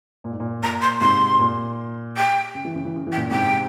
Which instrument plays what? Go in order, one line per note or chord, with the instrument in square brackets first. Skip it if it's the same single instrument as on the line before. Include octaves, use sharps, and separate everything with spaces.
[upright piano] A#2
G#2
A#2
[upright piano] A#2 [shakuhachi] A#5
[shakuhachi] C6
[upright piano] G#2 C3 [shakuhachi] C6
[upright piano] A#2
[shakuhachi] G5
[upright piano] C#3
E3
C#3
E3
C#3
[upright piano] E3 [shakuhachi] G5
[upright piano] A#2 C#3
[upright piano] G#2 C3 [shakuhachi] G5